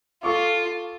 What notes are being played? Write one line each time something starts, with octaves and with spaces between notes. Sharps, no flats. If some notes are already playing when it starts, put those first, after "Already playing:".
F4 A4 C#6 D6